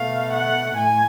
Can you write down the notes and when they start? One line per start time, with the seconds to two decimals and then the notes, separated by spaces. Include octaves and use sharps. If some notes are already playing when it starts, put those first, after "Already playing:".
Already playing: B2 A3 F5
0.33 F#5
0.76 A2 G#5